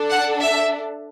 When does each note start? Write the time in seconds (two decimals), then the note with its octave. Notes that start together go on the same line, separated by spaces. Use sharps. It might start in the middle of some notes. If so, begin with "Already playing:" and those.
Already playing: D4 A4
0.10 F#5
0.41 E5